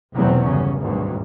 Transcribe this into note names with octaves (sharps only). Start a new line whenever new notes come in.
F1 E2 B2 F#3 B3 C4
G1 C#3 C#4
G#1 D2 G2 B2 F#3